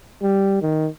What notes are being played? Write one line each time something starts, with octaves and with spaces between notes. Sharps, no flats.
G3
D#3